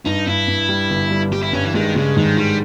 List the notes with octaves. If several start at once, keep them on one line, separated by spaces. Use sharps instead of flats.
G2 D#4
G2 E4
G2
G3
G1
G3
G3 G4
E4
G2 C#4
E3
D#3 G#3
C#3 G#3
G#2 D#3
D#3 G3